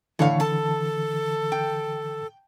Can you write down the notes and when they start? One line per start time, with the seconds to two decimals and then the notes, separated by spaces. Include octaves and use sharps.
0.19 A2 D3 E3 C#5 F5
0.40 A4 A5
1.52 G5